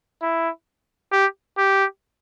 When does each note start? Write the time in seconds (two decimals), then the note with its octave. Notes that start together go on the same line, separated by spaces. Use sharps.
0.22 E4
1.12 G4
1.58 G4